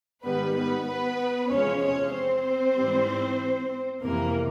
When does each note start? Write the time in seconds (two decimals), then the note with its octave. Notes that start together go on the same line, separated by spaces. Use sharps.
0.23 G#2 D#3 G3 B3 B4
0.55 B3 B4
0.86 B3 B4
1.50 E2 C3 F3 G#3 C#4 C#5
1.81 C#4 C#5
2.13 C4 C5
2.76 G#2 E3 G3
4.02 F2 C3 E3 A#3 A#4